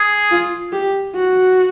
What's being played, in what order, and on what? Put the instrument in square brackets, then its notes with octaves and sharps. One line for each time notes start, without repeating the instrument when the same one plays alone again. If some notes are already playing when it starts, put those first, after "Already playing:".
Already playing: [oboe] G#4
[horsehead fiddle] F4
G4
F#4